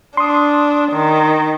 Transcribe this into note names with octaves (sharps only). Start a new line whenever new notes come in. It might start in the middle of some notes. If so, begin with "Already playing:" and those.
D4 C6 D#6
D#3